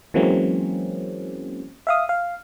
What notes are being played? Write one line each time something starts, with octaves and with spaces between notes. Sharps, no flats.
E3 F#3 G#3 A#3 C4 C#4
E5 F5 D#6
F5